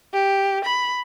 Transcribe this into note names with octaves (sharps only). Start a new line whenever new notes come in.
G4
B5